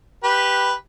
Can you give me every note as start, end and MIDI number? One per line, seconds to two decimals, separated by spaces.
0.24 0.73 67
0.24 0.73 71